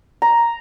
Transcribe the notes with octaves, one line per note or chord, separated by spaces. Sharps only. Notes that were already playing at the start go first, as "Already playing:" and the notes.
A#5